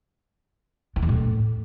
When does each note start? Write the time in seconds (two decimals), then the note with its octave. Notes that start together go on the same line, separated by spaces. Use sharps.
0.96 E3
1.02 E2
1.09 A2